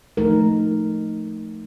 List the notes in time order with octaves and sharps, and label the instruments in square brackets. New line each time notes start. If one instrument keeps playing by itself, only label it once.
[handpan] F3 A3 D#4 A#4